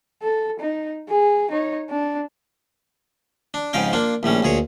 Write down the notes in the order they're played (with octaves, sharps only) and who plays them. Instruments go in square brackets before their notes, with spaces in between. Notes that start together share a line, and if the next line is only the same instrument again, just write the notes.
[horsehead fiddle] A4
D#4
G#4
D#4 C#5
D4
[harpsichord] D4
F2 G#2 C#3 D#4 F5 G5
A#3 D4 F4
A#1 A2 G3 C#4
D2 A#2 G#4 C#5